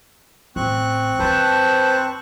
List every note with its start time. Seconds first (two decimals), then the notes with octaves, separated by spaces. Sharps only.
0.56 A1 C4 C#6 F#6
1.19 F#2 D#3 B4 C5 A5